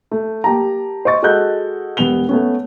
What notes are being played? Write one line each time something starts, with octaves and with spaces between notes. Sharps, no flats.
A3
A#3 G4 A5 A#5
C5 D#5 C#6 A6
G#3 F#4 A4 D#5 F#6 G6
E1 G3 B3 F7 G7
A3 B3 C#4